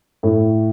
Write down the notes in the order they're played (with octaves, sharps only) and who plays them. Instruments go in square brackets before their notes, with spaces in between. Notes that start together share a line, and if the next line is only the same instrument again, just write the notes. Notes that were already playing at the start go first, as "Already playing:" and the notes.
[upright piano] A2